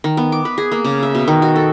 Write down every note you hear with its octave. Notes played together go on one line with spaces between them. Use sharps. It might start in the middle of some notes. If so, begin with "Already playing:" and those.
D#3
B3
D6
B4
G#4
A#3
C#3
E5
B2
D#3
F#4
A4